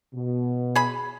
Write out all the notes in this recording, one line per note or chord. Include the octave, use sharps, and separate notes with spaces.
B2
G#4 B5